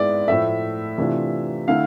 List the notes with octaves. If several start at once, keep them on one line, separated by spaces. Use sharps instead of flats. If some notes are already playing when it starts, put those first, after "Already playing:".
Already playing: G#2 G#3 B3 E4 D5
A2 F3 A3 E5
C3 E3 A3 D4 F4
D3 A3 E4 F5